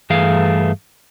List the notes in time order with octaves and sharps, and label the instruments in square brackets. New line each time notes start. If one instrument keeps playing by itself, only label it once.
[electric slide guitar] G2 E3 A3 G#4 F5